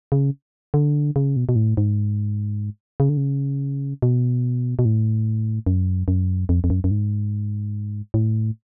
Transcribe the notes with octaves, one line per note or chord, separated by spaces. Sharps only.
C#3
D3
C#3
B2
B2
A2
G#2
C#3
D3
C#3
B2
B2
A2
F#2
F#2
F2
F2
F#2
F#2
G#2
A2